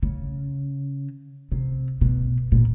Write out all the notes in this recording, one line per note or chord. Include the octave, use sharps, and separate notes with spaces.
C#3
C3
B2
A#2